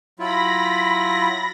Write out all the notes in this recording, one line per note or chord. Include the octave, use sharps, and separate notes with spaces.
F#3 E4 F4 B5 A#6